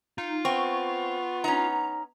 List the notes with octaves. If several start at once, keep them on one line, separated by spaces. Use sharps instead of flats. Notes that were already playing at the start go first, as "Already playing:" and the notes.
D#4 F4
B3 C4 C#6
C#4 D#4 A#5